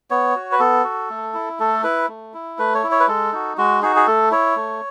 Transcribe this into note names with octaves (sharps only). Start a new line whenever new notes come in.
B3 C#5
F#4
B4
B3 A4
F#4
A3
E4
A3 A4
E4 B4
A3
E4
A3 B4
C#5
E4
C#5
B4
G#3 A4
D#4 F#4
G#3 F#4
D#4 F#4 G#4
G#4
A3 A4
E4 C#5
A3